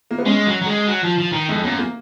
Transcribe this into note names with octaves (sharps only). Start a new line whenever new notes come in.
A#3
B3
G#3 C#4
F#3
F#3
G#3
F#3
F3
F3
D#3
F2 G#3
F#2 A#3
A#3